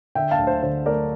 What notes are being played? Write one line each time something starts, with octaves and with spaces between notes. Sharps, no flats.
D3 E5 G5
F5 A5
D2
C5
D3 C5
A3 A#4 D5